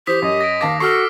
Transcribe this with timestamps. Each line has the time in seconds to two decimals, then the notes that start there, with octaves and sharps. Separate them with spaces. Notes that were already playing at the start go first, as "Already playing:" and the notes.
0.07 E3 G4 C5 D#6 B6
0.22 F#2 D#5
0.41 A#6 D7
0.61 D#2 F5 A5 D6 A#6
0.80 F#4 A4 C#6 F6 C7